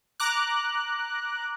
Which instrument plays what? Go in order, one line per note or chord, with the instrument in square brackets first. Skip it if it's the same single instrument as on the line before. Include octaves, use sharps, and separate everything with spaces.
[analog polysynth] A#5 D6 F#6